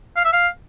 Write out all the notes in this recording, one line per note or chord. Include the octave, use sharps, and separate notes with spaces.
F5
E5
F5